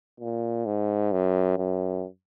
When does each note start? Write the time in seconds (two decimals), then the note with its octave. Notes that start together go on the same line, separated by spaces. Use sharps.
0.20 A#2
0.66 G#2
1.12 F#2
1.58 F#2